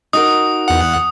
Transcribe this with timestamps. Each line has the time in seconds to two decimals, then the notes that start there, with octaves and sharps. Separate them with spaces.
0.13 D#4 F#4 A#4 D#6
0.68 E2 F#5